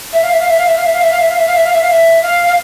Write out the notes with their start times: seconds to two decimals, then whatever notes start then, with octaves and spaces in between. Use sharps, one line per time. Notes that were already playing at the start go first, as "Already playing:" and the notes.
0.13 E5
0.22 F5
0.32 E5
0.40 F5
0.48 E5
0.58 F5
0.66 E5
0.76 F5
0.85 E5
0.93 F5
1.02 E5
1.11 F5
1.20 E5
1.29 F5
1.37 E5
1.47 F5
1.55 E5
1.65 F5
1.73 E5
1.82 F5
1.90 E5
2.22 F5
2.47 F5